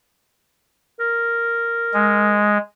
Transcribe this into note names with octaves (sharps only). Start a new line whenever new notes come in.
A#4
G#3